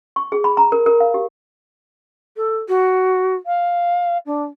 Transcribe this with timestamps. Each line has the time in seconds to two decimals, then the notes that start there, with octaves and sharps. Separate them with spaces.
0.16 C#6
0.32 G#4
0.44 B5
0.57 A#5
0.72 A#4
0.86 A#4
1.00 F5
1.14 G4
2.37 A4
2.68 F#4
3.46 F5
4.26 D4